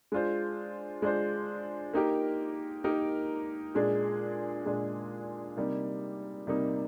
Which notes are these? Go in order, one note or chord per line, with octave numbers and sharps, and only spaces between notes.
G#3 D4 F4 C5
G#3 D4 F4 C5
A#3 D#4 G4 A#4
A#3 D#4 G4 A#4
A#2 G#3 D4 G#4
A#2 G#3 D4 G#4
C3 G3 A#3 D#4
C3 G3 A#3 D#4